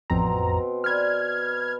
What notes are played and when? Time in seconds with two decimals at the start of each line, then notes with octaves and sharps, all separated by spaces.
0.10 A1 F2 B2 C4 A#5
0.84 B4 D5 F6 G#6